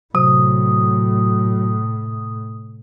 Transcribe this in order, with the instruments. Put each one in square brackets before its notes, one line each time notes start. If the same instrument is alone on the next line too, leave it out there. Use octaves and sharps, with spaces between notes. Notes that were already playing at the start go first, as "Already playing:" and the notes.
[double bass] A2 [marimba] C3 [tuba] F#3 [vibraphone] D#6